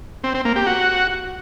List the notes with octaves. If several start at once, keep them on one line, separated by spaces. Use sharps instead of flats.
C4
C4
A#3
G4
F#4